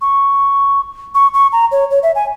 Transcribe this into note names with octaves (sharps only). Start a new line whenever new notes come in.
C#6
C#6
C#6
A#5
C#5
C#5
E5
G#5